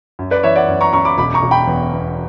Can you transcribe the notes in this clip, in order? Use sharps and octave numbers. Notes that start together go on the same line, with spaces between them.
F#2
B4 D5
E3 C#5 E5
D5 F#5
F#2
A#5 C#6
F#2 A#5 C#6
B5 D6
E1 B5 D6
A#5 C#6
E1
G5 B5
E2
E2